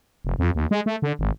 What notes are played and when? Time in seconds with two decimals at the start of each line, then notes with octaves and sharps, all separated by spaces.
0.25 F1
0.39 F2
0.55 D#2
0.71 G#3
0.86 A3
1.02 D3
1.19 G#1